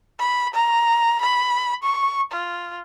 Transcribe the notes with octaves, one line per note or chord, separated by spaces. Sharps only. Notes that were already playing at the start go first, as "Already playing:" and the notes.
B5
A#5
B5
C#6
F4